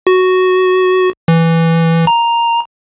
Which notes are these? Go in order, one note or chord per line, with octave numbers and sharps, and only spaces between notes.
F#4
E3
A#5